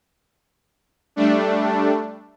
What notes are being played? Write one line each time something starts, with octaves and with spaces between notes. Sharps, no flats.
G3 A3 D4